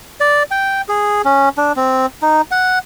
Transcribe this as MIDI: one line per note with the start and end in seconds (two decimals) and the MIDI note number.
0.20 0.43 74
0.51 0.81 79
0.89 1.22 68
1.25 1.49 61
1.58 1.72 62
1.76 2.06 60
2.22 2.42 63
2.51 2.79 78